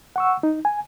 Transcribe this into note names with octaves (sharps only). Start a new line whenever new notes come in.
F#5 C#6 E6
D#4
G#5